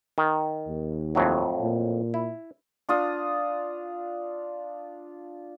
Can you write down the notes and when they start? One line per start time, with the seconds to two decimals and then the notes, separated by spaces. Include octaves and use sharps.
0.18 D#3
0.68 D#2
1.15 F2 A2 F#3
1.62 A#2
2.14 E4
2.89 D4 F4 D#6